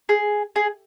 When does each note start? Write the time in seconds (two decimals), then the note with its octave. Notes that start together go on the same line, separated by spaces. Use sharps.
0.09 G#4
0.56 G#4